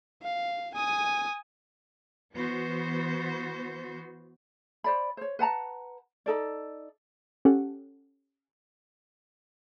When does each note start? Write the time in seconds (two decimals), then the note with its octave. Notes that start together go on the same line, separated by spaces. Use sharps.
0.23 F5
0.74 G#5 D#6
2.34 E3 B3 F#4 C5
4.84 C5 D5 B5
5.17 C5 C#5
5.39 B4 F#5 A5 A#5
6.26 D#4 A4 D5
7.45 C#4 G4 A4 F#5